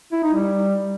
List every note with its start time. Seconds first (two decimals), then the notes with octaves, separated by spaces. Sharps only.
0.12 E4
0.23 D#4
0.34 G3